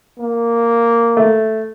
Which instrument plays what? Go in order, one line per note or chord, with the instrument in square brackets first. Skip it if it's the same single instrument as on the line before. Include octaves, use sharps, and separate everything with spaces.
[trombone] A#3
[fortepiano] A3